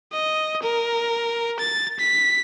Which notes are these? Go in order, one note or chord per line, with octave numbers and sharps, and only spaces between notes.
D#5
A#4
A6
B6